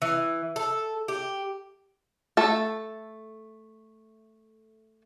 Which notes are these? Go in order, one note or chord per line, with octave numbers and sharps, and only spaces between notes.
E3
A4
G4
A3 A4